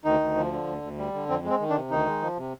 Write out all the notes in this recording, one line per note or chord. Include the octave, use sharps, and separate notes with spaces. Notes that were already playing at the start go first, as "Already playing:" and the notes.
D2 D#3 D#4
D2
F3
D3
D2
D2
G3
D3
F2 C4
G#3 C4
D#3
D3 D4
C3
D2 D#3 D#4
G#3
F3
C3